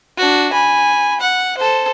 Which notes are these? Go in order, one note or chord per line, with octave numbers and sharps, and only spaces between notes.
D4 F#4
G#5 B5
F#5
A4 C5